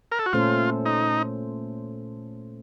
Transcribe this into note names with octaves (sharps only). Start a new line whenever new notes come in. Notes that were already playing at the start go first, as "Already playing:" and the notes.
A#4
A4
F#4
A#2 A3 C#4 F4 A4 C5
D#4